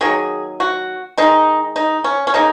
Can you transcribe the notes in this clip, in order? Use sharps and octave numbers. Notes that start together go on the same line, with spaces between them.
D#3 F#3 A#3 G#4
F#4
D#3 G#3 D#4
D#4
C#4
C#4
C#3 A#3 D#4